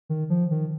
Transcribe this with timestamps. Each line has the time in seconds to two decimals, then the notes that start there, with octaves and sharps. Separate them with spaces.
0.09 D#3
0.30 F3
0.51 D#3